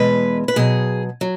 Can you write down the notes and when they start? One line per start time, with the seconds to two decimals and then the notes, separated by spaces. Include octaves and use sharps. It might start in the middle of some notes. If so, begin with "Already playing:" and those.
Already playing: E2 B2 G#3 B4
0.48 B4
0.56 B2 F#3 G#4
1.21 F#3